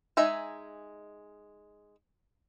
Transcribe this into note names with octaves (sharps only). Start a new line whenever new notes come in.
G#3 D#4 E5 G#5